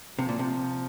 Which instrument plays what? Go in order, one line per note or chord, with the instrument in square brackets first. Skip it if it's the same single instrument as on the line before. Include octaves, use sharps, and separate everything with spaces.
[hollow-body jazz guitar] C3 [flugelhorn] F3
[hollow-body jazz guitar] A#2
C3